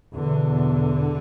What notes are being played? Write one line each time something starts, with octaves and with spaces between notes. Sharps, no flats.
E2 B2 D3